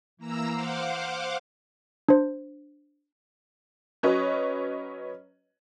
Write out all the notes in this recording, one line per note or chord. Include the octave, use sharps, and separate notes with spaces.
E3 A#3 A#5 E6
C5 F5 F#5 D6
D4 C5
F#3 C#4 B4 C#5 D#5